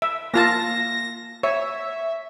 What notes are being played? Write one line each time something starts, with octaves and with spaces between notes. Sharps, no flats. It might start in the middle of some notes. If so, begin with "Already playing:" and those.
E5
A#3 F4 A5 A#6
C#5 E5